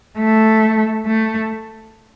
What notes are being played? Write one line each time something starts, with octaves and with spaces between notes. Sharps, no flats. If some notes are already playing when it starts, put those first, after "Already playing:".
A3
A3